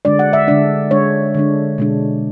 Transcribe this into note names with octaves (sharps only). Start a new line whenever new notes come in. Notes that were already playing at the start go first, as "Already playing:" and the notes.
D3 G#3 D4 D5
F#5
E5
D3 G#3 D4 D5
D3 G#3 D4 C#5
D3 G#3 D4
B2 G#3 D4